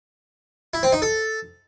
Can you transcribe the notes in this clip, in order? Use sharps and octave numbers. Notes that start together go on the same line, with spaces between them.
E4
C4
D#4
A4